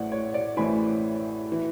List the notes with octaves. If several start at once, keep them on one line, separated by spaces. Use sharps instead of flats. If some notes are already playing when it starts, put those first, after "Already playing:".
Already playing: A1 A2 E3 D5 F#5
C#5
D5
A1 A2 E3 G#5 B5
E3